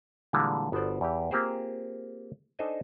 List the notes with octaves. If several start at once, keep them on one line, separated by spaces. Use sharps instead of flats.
A#2 D3 E3 G3 G#3
G1 B3 F#4 A4 C5 D5
E2 E3 G4
A#3 C4 F4 G4 G#4 C5
D4 D#4 A4 C5 D#5 G#5